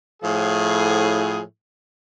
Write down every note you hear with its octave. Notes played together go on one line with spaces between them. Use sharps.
A2 F3 G#4